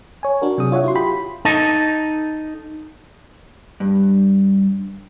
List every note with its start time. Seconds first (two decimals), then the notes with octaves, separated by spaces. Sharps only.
0.23 C#5 G#5
0.42 D4 F#4 A#4
0.58 C3 F#3 G#4 D#6
0.72 F4 C#5 E5 F#5
0.84 E4 F#4 C6
0.95 F4 G4 G5 B5 C6
1.45 D#4 A4
3.80 G2